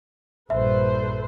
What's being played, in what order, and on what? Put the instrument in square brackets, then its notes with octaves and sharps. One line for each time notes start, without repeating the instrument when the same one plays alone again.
[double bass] A#1 G2 [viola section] A4 B4 C5 [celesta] E5